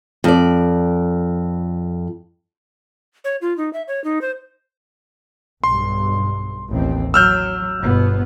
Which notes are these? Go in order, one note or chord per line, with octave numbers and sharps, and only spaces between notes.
F2 D5
C#5
F4
D#4
E5
C#5
D#4
C5
B1 G2 C6
A1 D#2 C4
F#3 E6 F6 G6
G1 B2 B3